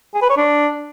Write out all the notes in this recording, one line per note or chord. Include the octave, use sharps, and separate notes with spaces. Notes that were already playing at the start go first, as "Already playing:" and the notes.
G#4
B4
C#5
D4